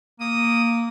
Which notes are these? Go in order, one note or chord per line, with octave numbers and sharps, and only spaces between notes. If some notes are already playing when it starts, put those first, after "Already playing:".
A#3 D#6